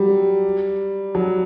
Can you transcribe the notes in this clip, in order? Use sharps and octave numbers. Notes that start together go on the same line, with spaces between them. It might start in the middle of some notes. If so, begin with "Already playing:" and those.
Already playing: F#3 G3
F#3